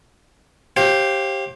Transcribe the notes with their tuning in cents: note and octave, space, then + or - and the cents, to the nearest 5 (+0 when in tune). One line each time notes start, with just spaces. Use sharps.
G4 +0 C5 +40 F5 +0